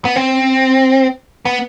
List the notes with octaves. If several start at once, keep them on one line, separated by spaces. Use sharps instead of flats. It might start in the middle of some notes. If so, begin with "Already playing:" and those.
B3
C4
B3